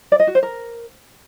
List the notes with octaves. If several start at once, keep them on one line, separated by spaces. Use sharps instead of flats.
D5
D#5
F#4
C5
A#4